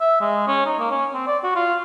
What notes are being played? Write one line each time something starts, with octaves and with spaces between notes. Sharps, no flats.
E5
G#3
C#4
D#4
A#3
C#4
C4
D5
F#4
F4